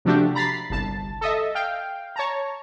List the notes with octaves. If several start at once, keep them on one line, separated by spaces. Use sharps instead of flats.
C3 F3 A3 D4 F#4 G4
A#5 B5 A6 B6 C7
G1 C2 A5
A4 D#5 E5
F5 G5
C#5 A5 A#5